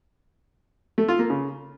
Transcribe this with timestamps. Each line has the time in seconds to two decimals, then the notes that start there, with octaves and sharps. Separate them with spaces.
0.98 A3
1.08 F4
1.19 A#3
1.30 C#3